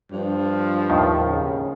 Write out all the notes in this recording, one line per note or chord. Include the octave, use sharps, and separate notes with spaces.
G2 F3
D#2 A2 D#3
C#3